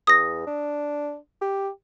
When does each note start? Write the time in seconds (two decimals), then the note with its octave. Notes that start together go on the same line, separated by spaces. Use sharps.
0.07 E2 D#6 A#6
0.47 D4
1.41 G4